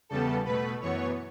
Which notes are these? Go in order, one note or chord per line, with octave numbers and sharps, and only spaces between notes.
E2 C#3 G3 B3 A4 A5
B2 A3 B4 B5
F#2 E3 B3 C#5 C#6